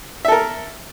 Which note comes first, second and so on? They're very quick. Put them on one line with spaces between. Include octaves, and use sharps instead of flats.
E5 A4 A#4